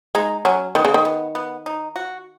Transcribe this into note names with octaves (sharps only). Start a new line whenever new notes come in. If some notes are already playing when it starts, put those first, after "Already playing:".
G#3 D#4
F#3 C#4
D#3 B3
C#3
D#3
B3
B3
D#4
F#4